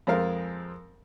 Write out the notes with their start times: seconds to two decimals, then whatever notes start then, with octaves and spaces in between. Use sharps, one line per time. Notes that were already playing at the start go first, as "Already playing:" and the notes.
0.07 F2 G#3 C4 A#4 F5